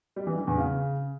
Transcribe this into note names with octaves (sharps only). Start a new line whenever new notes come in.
G3
E3
D3
E2
C#3